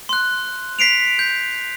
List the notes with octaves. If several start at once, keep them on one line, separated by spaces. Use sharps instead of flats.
C6 F#6
B6 C7 D7 F7
G6